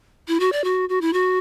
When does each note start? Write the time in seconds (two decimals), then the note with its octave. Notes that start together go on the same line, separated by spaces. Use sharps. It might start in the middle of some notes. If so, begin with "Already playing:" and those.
0.28 E4
0.40 F#4
0.52 D5
0.64 F#4
0.89 F#4
1.01 E4
1.13 F#4